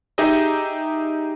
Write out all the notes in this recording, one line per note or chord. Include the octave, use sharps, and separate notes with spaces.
D#4 G4 G#4 D#5 E5